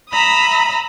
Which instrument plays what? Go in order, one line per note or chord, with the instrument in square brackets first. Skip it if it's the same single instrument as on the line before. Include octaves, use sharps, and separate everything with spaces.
[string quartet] E5 A#5 B5 D#6